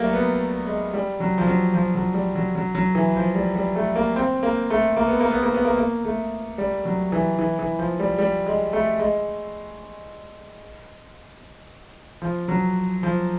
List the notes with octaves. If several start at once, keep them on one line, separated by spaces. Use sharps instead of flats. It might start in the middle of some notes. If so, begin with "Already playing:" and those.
Already playing: F#3 G3 A3 A#3
B3
G#3
G3
F#3
F3
F#3
F3
F#3
G3
F#3
F#3
F#3
E3
F3
G3
G3
A3
A#3
C4
A#3
A3
A#3
B3
A#3
B3
A#3
B3
A#3
A#3
A3
G3
F#3
E3
E3
E3
F3
G3
G3
G#3
A3
G#3
F3
F#3
F3